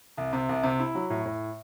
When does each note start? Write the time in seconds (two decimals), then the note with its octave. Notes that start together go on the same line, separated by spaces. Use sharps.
0.17 C2
0.33 C3
0.49 C2
0.63 C3
0.79 E4
0.95 F#3
1.10 A2
1.25 A2